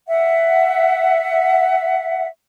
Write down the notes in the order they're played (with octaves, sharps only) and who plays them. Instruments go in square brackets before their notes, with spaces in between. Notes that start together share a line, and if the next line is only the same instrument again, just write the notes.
[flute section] E5 F#5